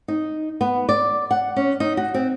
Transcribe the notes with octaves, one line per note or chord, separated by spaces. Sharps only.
D#4
B3
D5
F#5
C#4
D#4
F#4
C4